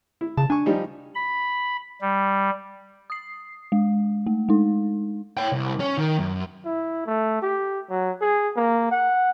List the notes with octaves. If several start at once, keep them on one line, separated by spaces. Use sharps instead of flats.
E4
C#3 A5
D4 G#5 C#6
F3 G3 D#4
B5
G3
D#6 C7
G#3
A3
G#3 D#4
C#5 G5
C2
C#4
D#3
F#2
E4
A3
G4
F#3
G#4
A#3
F#5